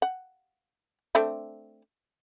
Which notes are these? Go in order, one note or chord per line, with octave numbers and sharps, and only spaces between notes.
F#5
A3 C4 D4